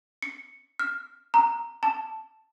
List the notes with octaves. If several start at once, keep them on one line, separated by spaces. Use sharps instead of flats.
C#7
F6
A#5
A5